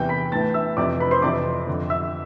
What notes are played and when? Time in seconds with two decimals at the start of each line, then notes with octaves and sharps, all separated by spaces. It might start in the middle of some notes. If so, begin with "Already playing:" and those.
Already playing: E2 C3 E3 G5 G6
0.09 B5 B6
0.32 A2 E3 A5 A6
0.54 E5 E6
0.77 F2 C3 E3 D5 D6
0.99 B4 B5
1.11 C5 C6
1.22 F2 C3 E3 D5 D6
1.67 F2 D3
1.90 E5 E6